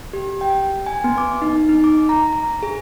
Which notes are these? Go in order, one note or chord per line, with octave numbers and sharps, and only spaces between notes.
G4
G5
G#5
B3
D6
D#4
D#4
D6
A#5
A#5
G#4